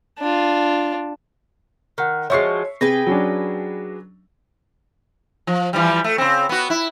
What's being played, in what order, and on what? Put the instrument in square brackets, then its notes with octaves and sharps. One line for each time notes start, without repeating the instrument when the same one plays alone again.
[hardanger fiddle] D4 F4
[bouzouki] D#3 [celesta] A#4 F#5 F#6
[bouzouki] F3 F#3 G#3 [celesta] C#5 [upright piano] E5 C#6 C7
[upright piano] C3 [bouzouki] G#4 B4 G5 [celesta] A#6
[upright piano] F#3 C#4 D4
[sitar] F3
E3 F3 G3
A3
C#3 C4
B3 F#4
E4